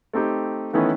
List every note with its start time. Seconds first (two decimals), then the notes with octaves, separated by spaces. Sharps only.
0.13 A3 C4 D#4 G4
0.73 D#3 E3 A3 B3 C#4 E4